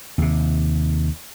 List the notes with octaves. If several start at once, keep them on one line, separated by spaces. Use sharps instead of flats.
D#2 C3